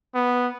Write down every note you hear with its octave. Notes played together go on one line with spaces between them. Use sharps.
B3